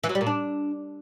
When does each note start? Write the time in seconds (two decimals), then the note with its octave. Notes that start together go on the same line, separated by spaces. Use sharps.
0.04 E3
0.09 F#3
0.15 G3
0.21 A#2
0.27 D4